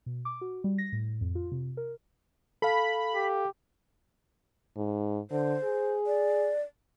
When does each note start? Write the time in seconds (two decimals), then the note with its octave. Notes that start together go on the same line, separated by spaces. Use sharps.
0.06 B2
0.25 D6
0.41 F#4
0.64 G3
0.78 A#6
0.92 A2
1.21 F2
1.35 F4
1.52 C3
1.77 A#4
2.62 A4 F5 B5
3.15 G4
4.76 G#2
5.31 D3 C5
5.64 G#4
6.07 D5